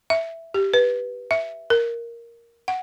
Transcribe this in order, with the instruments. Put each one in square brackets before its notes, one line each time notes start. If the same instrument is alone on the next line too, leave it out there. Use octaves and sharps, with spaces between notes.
[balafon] E5
G4
B4
E5
A#4
F#5